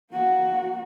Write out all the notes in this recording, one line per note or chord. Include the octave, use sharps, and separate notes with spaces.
A#3 F#4